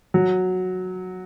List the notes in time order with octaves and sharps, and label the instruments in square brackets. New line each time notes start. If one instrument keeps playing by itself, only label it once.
[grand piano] F#3